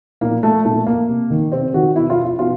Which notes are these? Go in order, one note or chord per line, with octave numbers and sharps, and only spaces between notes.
A#2 A#3
A3
A#2 A3
A#3
C3
D#3
C3 C4
D#3 F#4
B2 E4
F4
F4
B2 F4